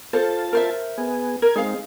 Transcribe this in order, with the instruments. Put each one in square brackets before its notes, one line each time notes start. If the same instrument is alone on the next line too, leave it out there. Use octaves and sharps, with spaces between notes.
[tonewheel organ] F4 A5 [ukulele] A4 C5
[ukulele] A#4 C5 E5
[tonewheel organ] B3 G#4
[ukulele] A#4 [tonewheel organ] G#6
[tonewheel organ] G#3 C4 D#4 [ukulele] G#4 F5